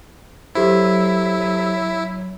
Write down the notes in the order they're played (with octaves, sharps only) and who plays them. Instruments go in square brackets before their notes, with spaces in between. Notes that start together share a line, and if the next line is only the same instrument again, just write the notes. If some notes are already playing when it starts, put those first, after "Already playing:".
[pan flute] F#3 [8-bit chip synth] E4 [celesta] G4 A4 C5